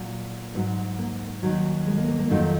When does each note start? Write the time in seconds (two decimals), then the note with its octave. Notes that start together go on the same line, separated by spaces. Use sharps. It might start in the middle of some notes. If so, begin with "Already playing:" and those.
Already playing: A#2 F#3
0.55 G#2 F#3
0.99 A#3
1.43 D#2 D#3 F#3
1.87 G#3
1.98 A#3
2.08 A#3
2.19 A#3
2.30 F2 D#3 F#3 A#3